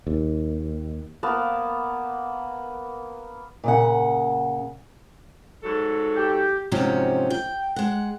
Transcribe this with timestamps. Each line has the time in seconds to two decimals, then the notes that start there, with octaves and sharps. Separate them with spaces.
0.07 D#2
1.23 A#3 B3 A#4 A5
3.64 A#2 C#3 F#5
5.63 G#2 F#3 A4
6.16 G4
6.71 G#2 C3 F3 F#3 C#4 G4
7.30 G5
7.76 G#3 F#5